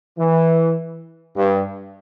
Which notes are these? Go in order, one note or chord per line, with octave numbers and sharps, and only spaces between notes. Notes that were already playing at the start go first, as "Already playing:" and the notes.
E3
G2